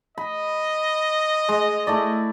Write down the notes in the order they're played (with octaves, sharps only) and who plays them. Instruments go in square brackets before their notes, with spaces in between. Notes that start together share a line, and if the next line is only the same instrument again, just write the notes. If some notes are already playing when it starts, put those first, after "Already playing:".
[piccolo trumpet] D#5 [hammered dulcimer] B5
[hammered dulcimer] G#3
A3 E4 D5